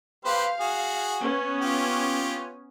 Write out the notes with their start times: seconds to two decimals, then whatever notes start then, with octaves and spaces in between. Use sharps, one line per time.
0.25 G4 B4 C5 F5
0.60 F#4 G#4
1.21 B3 C#4
1.62 F4 G4